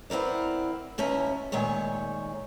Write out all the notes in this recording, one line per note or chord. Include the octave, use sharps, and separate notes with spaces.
B3 C4 E4 A#4 D5
D#2 B2 C#4 E5 G#5 A#5
A#2 D#3 G#3 A3 C#5